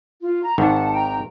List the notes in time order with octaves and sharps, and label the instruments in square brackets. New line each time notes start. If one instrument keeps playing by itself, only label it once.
[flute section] F4
A#5
[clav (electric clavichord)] G#1 G#2 D#3 [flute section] F#5 A5
[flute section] G5 A#5